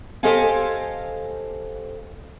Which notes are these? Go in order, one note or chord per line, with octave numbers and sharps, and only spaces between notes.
G4 A4 C5 D#5 F5 G#5